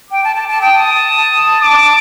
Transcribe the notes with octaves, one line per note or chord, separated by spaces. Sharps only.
G5 D6
A5
A5
A5
G5 D#6
A5
A5
D6